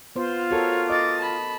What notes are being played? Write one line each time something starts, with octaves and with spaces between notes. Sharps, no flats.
B3 F4 C5
F#4 A4 A#4 C#5
D#5 D6 A6
A5 B5